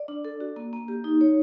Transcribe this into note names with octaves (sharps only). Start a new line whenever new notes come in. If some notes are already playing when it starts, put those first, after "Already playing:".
Already playing: D5
D4
A4
F#4
A#3
A#3
G4
D#4
C#5